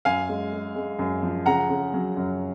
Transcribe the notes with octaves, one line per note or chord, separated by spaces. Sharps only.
F#2 F5 G#5
G#3
G#3
G#3
F#2
F3
C#3 F#5 A#5
C#3
F#3
F#2